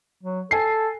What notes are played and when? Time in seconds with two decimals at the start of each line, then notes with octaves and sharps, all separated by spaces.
0.23 F#3
0.51 A4 G#5 C7